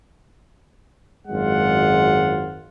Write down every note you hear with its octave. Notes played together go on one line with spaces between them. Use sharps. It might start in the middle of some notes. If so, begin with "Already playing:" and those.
G#1 F#2 G#3 F4 F#5